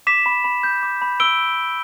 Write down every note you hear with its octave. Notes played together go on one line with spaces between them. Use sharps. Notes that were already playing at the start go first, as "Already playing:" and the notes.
D6 B6 E7
B5
B5
G6
D6
B5
E6 D7 G7